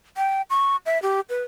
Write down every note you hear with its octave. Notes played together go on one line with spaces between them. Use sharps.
G5
C#6
E5
G4
B4